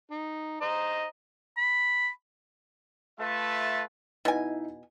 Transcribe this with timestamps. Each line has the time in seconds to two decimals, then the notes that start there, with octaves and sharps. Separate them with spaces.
0.11 D#4
0.61 C5 D#5 A#5
1.57 B5
3.20 A3 F4 A4 B4 E5 A5
4.25 B2 D#4 E4 G#5